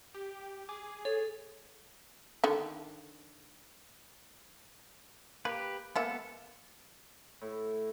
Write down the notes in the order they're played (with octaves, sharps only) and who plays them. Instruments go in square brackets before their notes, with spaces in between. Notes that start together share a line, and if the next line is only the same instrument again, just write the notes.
[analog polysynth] G4
[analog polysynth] G#4 [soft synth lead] D6
[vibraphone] A4 [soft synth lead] C#5
[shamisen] D3 D#3
[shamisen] A#3 [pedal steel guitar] G4 B4
[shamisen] G#3 A#3 E5 [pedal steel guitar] B3 A4
[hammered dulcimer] A2